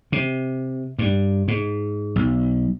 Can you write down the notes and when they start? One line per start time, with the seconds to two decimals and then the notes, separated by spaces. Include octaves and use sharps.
0.12 C3
0.99 G2
1.48 G#2
2.16 B1